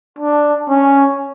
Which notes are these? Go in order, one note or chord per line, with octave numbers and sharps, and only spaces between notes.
D4
C#4